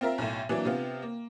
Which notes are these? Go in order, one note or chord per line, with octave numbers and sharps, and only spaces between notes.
C4 F4 A#4 E5
B1 A2
E3 F#3 A#3 D4
C3 B3 F4
A#3